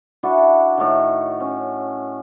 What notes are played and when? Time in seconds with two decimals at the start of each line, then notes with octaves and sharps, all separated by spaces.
0.23 D4 E4 F#4 A4
0.78 A2 D#3
1.40 C#4